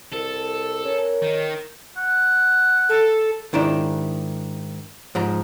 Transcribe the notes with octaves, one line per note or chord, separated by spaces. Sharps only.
C2 A4
C#4 A#4
D#3
F#5
A4
G#2 D#3 D4 E4
G#2 F3 A#5